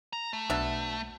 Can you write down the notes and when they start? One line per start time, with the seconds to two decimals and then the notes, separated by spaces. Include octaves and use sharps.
0.13 A#5
0.33 A3
0.50 B1 B2 D4 E5